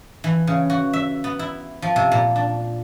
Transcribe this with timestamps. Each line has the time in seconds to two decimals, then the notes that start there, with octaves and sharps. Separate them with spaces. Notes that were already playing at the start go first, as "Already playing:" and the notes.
0.24 E3
0.47 C#3
0.70 F#4
0.93 E5
1.24 B3
1.39 E4
1.82 F3
1.96 C3
2.12 A#2
2.36 D4